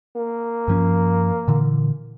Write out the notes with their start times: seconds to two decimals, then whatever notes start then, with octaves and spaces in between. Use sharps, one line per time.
0.16 A#3
0.68 G2 F3 C#4
1.48 A#2 D3 E3